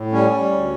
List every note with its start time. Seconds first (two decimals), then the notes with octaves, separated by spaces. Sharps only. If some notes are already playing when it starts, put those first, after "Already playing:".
Already playing: A2
0.12 G3 C#4
0.31 G3
0.51 D2